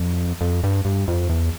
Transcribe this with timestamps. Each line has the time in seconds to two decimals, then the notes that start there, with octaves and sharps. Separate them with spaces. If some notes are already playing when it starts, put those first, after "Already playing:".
Already playing: F2
0.41 F2
0.64 G2
0.85 G2
1.08 F2
1.30 E2